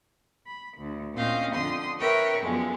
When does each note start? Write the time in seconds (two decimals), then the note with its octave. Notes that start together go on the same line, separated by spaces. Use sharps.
0.46 B5
0.76 D2
1.14 A#2 C4 C#4 D#5 F5 G6
1.53 F2 D3 C6 D#6
1.99 A#4 B4 C#5 E5 G5 C#6
2.40 F#2 D3 F3 G#3 B3